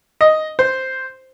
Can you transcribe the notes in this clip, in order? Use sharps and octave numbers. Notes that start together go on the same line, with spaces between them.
D#5
C5